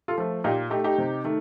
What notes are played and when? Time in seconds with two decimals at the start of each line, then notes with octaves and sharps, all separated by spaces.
0.08 F4 A4
0.18 F3 A3
0.44 A#2 D#4 G4
0.70 A3 D#4 G4
0.84 D#4 G4
0.98 C3
1.24 D#3 A3